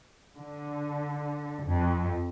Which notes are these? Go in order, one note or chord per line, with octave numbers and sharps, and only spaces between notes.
D3
F2